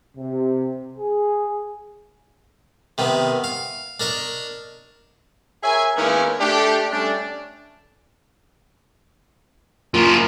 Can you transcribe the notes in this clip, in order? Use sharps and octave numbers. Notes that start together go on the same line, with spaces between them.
C3
G#4
C3 D#3 B3
F5
D4 A#4 D#5 C#6
G#4 A#4 C#5 E5 G#5
D#3 G#3 A#3 B3 C#4 E4
A3 D4 G4
G3 A3 C#4 D4
F#2 A#3 F4